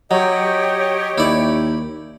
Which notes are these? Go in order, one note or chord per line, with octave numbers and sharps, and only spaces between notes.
F#3 G4 C#5 D#5
D#2 E4 D5